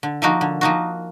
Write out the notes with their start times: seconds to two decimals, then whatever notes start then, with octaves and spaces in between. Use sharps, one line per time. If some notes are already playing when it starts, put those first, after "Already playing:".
0.03 D3
0.22 F3 A#3 D#4 F#4
0.41 D3
0.61 F3 A#3 D#4 F#4